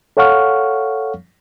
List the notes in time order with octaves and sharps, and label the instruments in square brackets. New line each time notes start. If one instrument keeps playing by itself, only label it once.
[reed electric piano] A4 C#5 F5 F#5 C#6 F6